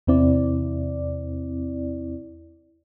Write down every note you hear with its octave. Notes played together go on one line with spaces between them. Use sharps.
E2 C3 C4 E4 D5